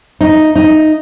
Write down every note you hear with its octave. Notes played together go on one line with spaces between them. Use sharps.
D#4
D#4